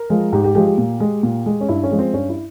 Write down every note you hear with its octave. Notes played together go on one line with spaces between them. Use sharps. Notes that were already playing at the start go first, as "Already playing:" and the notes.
Already playing: A#4
F3 G#3
G#2 G4
G4
F3 G#3 G4
G4
A#2
G#3
A#2
G#3
C#4
G2 E4
C#4
F3 G#3
C4
G2 C#4
E4